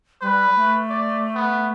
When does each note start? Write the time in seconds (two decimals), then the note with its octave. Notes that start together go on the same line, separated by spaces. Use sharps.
0.22 G3 B4
0.56 A3
0.89 D5
1.35 B3